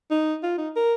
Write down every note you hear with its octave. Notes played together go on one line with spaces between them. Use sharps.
D#4
F4
D#4
A#4